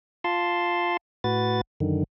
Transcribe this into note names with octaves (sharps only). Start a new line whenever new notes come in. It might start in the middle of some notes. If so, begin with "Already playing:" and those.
F4 A5 C6
A2 F#4 B4 A6
F#2 D3 D#3